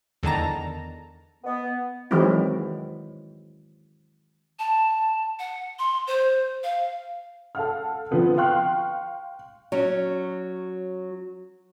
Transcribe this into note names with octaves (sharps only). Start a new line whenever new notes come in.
E2 D3 D#3 A5 A#5
B3
D#3 E3 F#3 G#3 C4 E4
A5
F#5
C6
C5
F5
A4 F5 F#5 F6
D3 F3 B3 C4
F5 G5 C6 C#6 F6 F#6
F#3 C#4